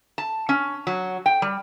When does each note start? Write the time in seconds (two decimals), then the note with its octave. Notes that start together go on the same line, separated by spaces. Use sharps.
0.18 A5
0.49 C#4
0.87 F#3
1.26 G5
1.42 G3